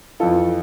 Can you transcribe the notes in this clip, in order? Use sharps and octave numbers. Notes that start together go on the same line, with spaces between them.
F2 E3 F4 A4